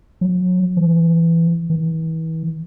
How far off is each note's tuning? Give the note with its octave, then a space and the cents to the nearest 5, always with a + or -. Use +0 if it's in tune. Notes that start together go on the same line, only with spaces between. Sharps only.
F#3 -35
E3 +15
E3 -35